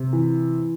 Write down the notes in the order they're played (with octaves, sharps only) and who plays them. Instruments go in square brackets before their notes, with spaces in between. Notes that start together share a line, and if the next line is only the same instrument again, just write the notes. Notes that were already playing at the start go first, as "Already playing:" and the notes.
Already playing: [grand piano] C3
E3